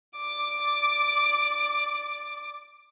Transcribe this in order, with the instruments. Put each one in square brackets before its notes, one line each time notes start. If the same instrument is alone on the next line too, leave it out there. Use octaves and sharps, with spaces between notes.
[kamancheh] D5 D6